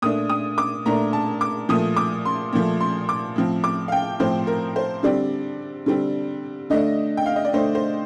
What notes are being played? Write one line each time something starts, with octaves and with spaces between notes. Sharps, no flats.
A#2 A3 D4 D#6
D#6
D6
A#2 A3 D4 A#5
A5
D6
A#2 F3 A3 D#6
D6
C6
A#2 F3 A3
C6
D6
A2 F3 C4
D6
F5
G5
A2 F3 C4 C5
A#4
C5
D3 G3 C4 D5
D3 G3 C4
D3 A3 D4 D#5
G5
F5
D#5
D5
D3 A3 D4 C5
C5